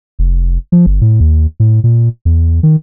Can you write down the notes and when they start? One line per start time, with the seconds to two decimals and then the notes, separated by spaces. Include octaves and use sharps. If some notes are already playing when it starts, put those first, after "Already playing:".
0.19 F1
0.72 F3
0.86 G1
1.01 A2
1.20 D#2
1.60 A2
1.84 A#2
2.25 E2
2.63 D#3